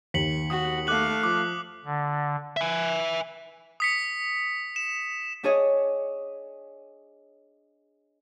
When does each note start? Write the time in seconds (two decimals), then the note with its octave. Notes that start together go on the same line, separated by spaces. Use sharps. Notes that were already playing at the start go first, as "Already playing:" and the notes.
0.14 D#2 B6 C#7 F#7
0.50 F#4 D#6
0.87 A3 F5 D6 F#6 F#7
1.23 F3 D6
1.85 D3
2.57 E5 G#5
3.80 D#6 B6 C#7
4.76 E7
5.43 D4 G#4 C#5 D#5